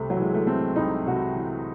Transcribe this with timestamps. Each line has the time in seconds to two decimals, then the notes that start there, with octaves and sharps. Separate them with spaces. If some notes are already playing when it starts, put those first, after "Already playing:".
Already playing: C2 C3 A3
0.10 F#3
0.17 E3 G#3
0.34 A3
0.47 A3 C4
0.76 C2 D#4
1.06 C3 F#4
1.36 E3